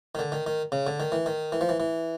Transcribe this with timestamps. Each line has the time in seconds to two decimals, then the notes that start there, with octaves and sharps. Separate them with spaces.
0.15 D#3
0.19 D3
0.32 D#3
0.47 D#3
0.72 C#3
0.87 D3
1.00 D#3
1.12 E3
1.26 D#3
1.52 E3
1.61 F3
1.69 E3
1.80 E3